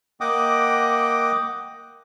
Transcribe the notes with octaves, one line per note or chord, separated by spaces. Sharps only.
A#3 D#5 F#5 G5 D6 D#6